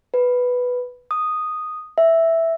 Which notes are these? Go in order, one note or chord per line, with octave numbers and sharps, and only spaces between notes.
B4
D#6
E5